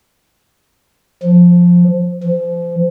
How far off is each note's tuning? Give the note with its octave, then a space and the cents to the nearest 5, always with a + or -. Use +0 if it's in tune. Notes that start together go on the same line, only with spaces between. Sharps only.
F3 +10
F3 -30